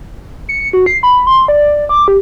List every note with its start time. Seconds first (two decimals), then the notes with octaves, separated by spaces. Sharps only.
0.49 C#7
0.73 F#4
0.86 C7
1.03 B5
1.27 C6
1.48 D5
1.89 D6
2.08 G4